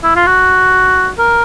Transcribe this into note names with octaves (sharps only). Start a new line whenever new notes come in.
E4
F4
F#4
A#4